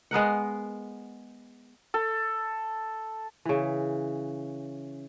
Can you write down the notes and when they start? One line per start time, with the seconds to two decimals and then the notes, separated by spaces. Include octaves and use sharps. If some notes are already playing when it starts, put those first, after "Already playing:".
0.11 G#3 B3 A#4 F#5
1.94 A4
3.45 C#3 E3